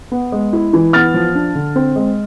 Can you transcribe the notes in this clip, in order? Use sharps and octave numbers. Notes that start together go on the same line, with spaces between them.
B3
G#3
E4
E3
B3 F6 A6
F3
D4
D3
C4
G#3